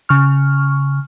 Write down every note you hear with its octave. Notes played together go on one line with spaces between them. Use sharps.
C#3 C#6 F6